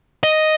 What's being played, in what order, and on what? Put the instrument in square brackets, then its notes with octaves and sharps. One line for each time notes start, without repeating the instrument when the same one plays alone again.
[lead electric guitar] D#5